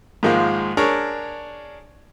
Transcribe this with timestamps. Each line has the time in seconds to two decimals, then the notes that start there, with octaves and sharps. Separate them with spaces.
0.23 G#2 D#3 F3 G#3 A#3
0.77 D4 G#4 A#4 C#5